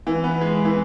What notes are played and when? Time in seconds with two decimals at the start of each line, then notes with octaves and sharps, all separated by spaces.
0.07 E3
0.24 B3
0.41 G#3
0.65 E3